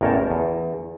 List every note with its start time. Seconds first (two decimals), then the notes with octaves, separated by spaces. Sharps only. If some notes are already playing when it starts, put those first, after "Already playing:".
0.01 A1 E2 A#4 C#5 G5 A5
0.30 E2